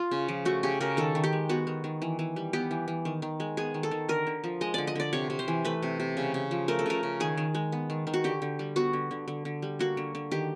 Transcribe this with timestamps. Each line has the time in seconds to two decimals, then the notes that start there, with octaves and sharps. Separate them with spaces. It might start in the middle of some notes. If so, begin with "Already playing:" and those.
Already playing: F4
0.11 C#3
0.28 F3
0.45 A3 F#4
0.63 C#3 G4
0.81 C#3 A#4
0.97 D#3 A4
1.15 D#3
1.24 G4
1.33 G#3
1.49 B3 F#4
1.67 D#3
1.84 D#3
2.02 E3
2.19 E3
2.36 G3
2.53 B3 G4
2.71 E3
2.88 E3
3.05 D#3
3.22 D#3
3.40 G#3
3.57 B3 G#4
3.74 D#3
3.83 A4
3.91 D#3
4.09 D3 A#4
4.27 D3
4.44 F3
4.61 G#3 D#5
4.74 D3 D5
4.87 D#5
4.95 D3 D5
5.13 C3 C#5
5.30 C3
5.39 C5
5.48 E3
5.65 A3 B4
5.83 C3
6.00 C3
6.17 C#3
6.34 C#3
6.51 F3
6.68 A3 A#4
6.79 A4
6.86 C#3 A#4
7.03 C#3
7.20 D#3 G#4
7.37 D#3
7.55 G#3
7.72 B3
7.90 D#3
8.07 D#3
8.14 F#4
8.24 D3 G4
8.42 D3
8.59 G3
8.76 B3 F#4
8.93 D3
9.11 D3
9.28 D3
9.45 D3
9.62 G3
9.79 A#3 F#4
9.97 D3
10.15 D3
10.31 D#3 G4